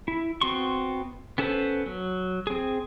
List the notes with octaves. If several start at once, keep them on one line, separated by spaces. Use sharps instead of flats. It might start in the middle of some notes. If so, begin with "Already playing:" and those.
E4
B3 C4 F#4 C6 C#6
B3 C#4 A4 B4 C5
F#3
C4 G#4